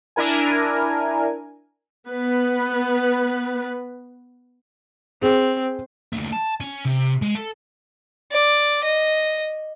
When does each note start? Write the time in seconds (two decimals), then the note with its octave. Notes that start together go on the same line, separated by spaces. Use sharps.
0.16 D4 E4 A#4 G#5
2.08 B3 B4
5.22 C4 G#4
6.13 D#2 A3
6.33 A5
6.61 C#4
6.85 C3
7.22 G#3
7.35 A4
8.32 D5
8.84 D#5